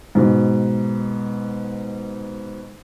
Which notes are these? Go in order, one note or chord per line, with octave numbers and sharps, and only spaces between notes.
G#2 B2